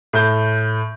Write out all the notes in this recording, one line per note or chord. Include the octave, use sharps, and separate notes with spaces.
A2 G6